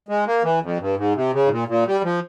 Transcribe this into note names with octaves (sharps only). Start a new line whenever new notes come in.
G#3
A#3
E3
F2
G2
G#2
C3
C#3
G#2
A#2
A#2
G3
F3